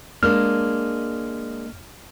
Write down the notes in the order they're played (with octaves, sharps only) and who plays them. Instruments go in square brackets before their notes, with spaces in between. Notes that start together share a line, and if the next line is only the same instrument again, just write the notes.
[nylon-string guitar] G#3 A#3 D4 [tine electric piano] F6